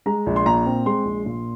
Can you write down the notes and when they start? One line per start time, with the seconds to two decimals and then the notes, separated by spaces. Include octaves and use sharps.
0.06 G#3 A#5
0.26 A#1
0.36 C6
0.46 A#2 A#5
0.66 C4
0.86 G#3 C6
1.05 A#1
1.26 A#2